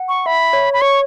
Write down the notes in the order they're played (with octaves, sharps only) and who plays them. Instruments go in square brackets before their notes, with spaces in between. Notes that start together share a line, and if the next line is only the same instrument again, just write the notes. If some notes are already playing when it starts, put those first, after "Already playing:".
Already playing: [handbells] F#5
[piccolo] C#6
[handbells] E5 [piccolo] B5
[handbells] C#5
[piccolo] B5
[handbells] C#5 [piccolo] C#6